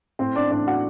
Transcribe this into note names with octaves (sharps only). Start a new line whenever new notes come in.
A2 C4 C5
D4 D5
A2 D4 D5
F#4 F#5